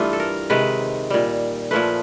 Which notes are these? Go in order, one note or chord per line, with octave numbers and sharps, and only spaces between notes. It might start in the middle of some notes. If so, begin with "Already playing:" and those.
Already playing: G2 E3 A3 F4
A4
A#4
C3 D#3 G#3 B4
A#2 G3
A#2 F3 A3 B4